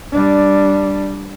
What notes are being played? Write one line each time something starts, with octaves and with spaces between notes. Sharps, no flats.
G3 D4